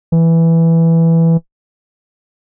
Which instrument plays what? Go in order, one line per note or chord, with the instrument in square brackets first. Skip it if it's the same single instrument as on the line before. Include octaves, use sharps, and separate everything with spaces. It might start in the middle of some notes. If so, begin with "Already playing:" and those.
[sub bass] E3